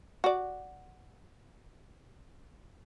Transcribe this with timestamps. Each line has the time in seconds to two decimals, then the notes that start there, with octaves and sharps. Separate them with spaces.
0.24 F#4 D5